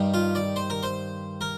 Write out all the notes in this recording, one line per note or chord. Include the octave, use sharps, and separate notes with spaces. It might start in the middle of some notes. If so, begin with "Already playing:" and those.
Already playing: G2 D#3 G3
F4
D5
C5
A#4
C5
A#4